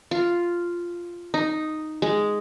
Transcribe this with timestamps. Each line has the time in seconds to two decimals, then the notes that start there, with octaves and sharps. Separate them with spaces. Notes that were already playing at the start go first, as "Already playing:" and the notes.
0.11 F4
1.34 D#4
2.02 G#3